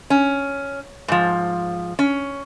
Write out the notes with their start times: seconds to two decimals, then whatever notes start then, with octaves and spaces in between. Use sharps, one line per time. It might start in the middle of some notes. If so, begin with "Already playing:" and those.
0.10 C#4
1.08 G#2 F3
1.99 C#4